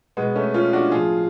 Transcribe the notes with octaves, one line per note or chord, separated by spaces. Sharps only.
B2 G#3 B3
A3 C#4
C#4 F4
D4 F#4
A2 F3 F4 G#4